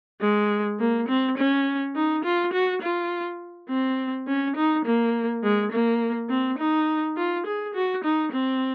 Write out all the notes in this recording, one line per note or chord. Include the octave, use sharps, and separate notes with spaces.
G#3
A#3
C4
C#4
D#4
F4
F#4
F4
C4
C#4
D#4
A#3
G#3
A#3
C4
D#4
F4
G#4
F#4
D#4
C4